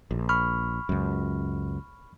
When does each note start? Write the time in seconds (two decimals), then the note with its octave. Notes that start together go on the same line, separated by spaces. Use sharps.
0.11 A#1
0.29 B5 C#6 F6
0.89 C#2 F#2